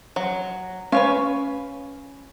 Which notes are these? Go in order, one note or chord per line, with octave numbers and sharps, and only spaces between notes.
F#3
C#4 B4 C#5 F5